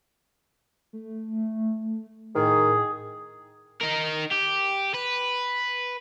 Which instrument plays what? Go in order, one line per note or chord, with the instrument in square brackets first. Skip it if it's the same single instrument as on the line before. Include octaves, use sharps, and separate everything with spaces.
[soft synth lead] A3
[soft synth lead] A2 [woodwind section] D#3 [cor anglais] G#4
[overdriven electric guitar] D#4 A#4
G4
B4